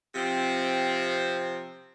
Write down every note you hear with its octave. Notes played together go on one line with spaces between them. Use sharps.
C3 F3 C4